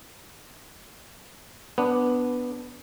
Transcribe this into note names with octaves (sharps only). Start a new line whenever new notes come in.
B3 D4